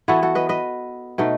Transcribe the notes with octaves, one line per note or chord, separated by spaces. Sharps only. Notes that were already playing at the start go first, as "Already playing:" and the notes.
E3 B3 E4 F#4 A4
F#4 A4
B4 D#5
B4 D#5
B2 A3 D#4